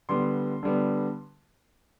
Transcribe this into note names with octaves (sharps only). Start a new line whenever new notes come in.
D3 G3 B3 C6
D3 G3 B3